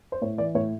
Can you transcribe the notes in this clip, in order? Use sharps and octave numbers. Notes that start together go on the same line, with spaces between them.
C5
A2 C#5
E3 D5
A2 C#5